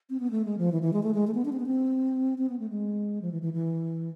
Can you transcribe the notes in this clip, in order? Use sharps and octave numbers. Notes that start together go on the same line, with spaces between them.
C4
B3
A3
G#3
F3
E3
E3
G#3
A3
G#3
A3
B3
D4
C4
B3
C4
C4
B3
A3
G#3
F3
E3
E3
E3